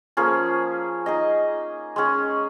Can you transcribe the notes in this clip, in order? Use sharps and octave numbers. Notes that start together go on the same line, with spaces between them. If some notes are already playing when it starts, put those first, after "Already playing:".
F3 A#3 C#4 G#4
D#4 G#4 D#5
G#3 C#4 G#4